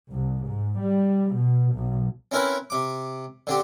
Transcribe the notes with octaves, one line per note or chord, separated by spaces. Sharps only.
C2
G#2
G3
B2
B1
C4 C#4 E4 A#4 B4
C3 D6
D3 C4 G4